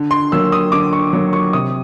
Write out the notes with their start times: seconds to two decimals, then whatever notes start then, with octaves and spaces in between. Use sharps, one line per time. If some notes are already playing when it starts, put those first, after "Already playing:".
Already playing: D3
0.11 C6
0.32 F#3 A#3 E6
0.52 D#6
0.72 D3 D6
0.93 C#6
1.13 F#3 A#3
1.33 C#6
1.53 C3 D#6